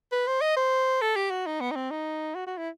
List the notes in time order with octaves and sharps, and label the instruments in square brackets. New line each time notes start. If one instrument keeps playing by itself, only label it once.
[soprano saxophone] B4
C5
D#5
C5
A4
G4
F#4
D#4
B3
D#4
C4
D#4
F#4
F#4
E4